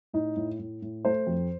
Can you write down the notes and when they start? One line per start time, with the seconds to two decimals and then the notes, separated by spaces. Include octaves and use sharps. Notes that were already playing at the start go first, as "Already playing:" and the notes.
0.13 A2 D#4
0.36 A2
0.59 A2
0.82 A2
1.05 A3 C5
1.27 F2